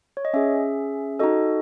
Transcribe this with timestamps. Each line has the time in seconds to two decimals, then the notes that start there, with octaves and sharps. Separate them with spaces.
0.17 C#5
0.25 D#5
0.34 C#4 G#4 E5
1.19 D#4 F#4 A4 D#5